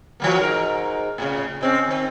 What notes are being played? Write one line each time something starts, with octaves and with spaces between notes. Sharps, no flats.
E3 F#3 A#3
G#2 A#4
A2 C#3
G#3 C4 C#4
D#3 C4